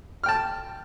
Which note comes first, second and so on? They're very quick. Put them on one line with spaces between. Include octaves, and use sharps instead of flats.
F6 G5 A5